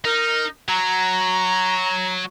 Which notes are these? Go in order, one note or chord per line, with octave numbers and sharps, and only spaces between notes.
D#4 A#4
F#3 A#5